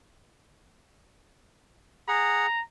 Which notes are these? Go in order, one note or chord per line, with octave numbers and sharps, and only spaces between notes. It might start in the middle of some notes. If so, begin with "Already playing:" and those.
G#4 F#5 A#5